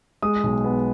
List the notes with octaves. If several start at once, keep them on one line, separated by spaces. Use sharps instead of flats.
G#3 D#6
B1
B3